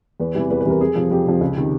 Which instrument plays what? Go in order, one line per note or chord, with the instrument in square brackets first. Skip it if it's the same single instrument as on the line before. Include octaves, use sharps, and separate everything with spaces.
[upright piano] E2 B4
C3 E3 G3
E2 B4
B4
C3 E3 G3 A#4
F2 G#4
C3 F3
F2 G4
C3 F3
C#2
C3 D#3